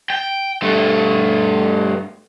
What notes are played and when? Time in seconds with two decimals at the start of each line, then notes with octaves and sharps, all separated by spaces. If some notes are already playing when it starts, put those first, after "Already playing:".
0.10 G5
0.62 G2 A3